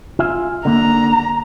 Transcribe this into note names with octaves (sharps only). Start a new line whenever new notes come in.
F4 E5 G#5
D3 A#3 A#5